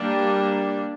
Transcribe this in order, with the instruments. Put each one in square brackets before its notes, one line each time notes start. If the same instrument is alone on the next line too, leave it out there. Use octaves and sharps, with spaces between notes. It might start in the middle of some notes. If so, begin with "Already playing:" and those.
Already playing: [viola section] G3 A#3 D4